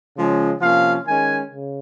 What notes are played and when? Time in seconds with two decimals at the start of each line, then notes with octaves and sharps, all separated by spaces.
0.16 C#3 F3 G#3 C#4
0.61 C3 F3 A#3 C#4 F5
1.06 D#3 G#3 C#4 G#5
1.51 C#3